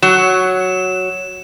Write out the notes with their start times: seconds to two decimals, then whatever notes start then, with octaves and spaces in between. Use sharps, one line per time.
0.03 F#3 E7